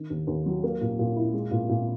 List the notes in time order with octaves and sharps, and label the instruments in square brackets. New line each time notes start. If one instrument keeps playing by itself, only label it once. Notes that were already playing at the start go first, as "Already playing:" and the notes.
Already playing: [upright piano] D#3
D#2
D#2
F#3
A#3
A#2
A#2
E4
G#3
A#2
A#2